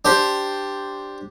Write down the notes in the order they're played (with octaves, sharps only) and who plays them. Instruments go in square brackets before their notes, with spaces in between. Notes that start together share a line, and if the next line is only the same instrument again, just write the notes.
[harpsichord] D4 G4 C5